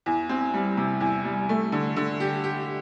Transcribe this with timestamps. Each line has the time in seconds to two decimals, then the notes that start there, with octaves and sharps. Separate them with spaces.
0.06 E2
0.29 C4
0.54 G3
0.77 C3
1.01 E2
1.25 G3
1.49 A3
1.72 D3
1.96 D3
2.20 G4
2.44 G4